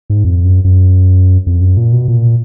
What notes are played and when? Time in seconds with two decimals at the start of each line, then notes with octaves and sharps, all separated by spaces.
0.10 G#2
0.24 F2
0.45 F#2
0.64 F#2
1.47 F2
1.61 F#2
1.77 A#2
1.93 B2
2.08 A#2